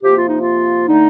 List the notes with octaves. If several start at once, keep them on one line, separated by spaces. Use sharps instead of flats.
C3 F3 A#3 G4
F4
D#4
F4
D3 A3 D#4